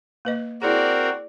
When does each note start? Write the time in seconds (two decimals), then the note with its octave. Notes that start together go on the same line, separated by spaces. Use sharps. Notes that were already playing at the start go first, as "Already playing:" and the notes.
0.25 A#3 B4 D#5
0.62 C4 E4 F#4 G#4 A#4 D5